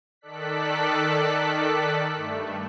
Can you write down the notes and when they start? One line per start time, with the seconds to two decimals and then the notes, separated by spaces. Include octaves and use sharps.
0.21 D#3 A4 D5 F#6 B6
2.16 G2 A3